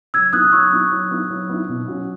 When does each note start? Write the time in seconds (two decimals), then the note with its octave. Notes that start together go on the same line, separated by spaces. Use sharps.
0.14 F#3 E6 G#6
0.33 B3 E4 D#6 F#6
0.53 F#3 C#6 E6
0.72 B3 E4
0.92 F#3
1.11 B3 E4
1.30 F#3
1.49 B3 E4
1.69 B2
1.88 F#3 C#4 F#4